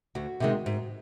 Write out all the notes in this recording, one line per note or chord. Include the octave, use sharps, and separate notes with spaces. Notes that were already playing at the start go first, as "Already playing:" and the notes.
D2 F#4
C3 D#3 G#3
G#2